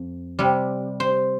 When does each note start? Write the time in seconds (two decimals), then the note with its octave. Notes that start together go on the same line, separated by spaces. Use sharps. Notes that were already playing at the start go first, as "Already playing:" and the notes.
Already playing: F2
0.39 C3 G3
1.00 C5